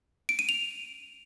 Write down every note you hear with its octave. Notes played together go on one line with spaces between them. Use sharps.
D7
D#7
F7